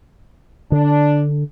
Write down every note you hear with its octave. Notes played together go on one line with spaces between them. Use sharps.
D3 D4